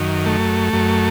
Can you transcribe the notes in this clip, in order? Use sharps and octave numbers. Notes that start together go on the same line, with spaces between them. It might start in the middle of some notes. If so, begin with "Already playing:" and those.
Already playing: F#2 D#3
A3
F#2